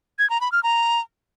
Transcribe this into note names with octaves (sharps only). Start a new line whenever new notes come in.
G#6
A#5
B5
F6
A#5